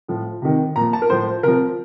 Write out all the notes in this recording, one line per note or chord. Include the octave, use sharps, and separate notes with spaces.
A2 F3
C3 D#3
A#2 F3 A#5
A5
A#4
A2 F3 C5
C3 F3 A#4